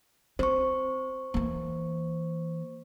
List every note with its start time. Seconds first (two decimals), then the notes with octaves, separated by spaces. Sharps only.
0.39 C4 C5 C#6
1.34 E3 A#3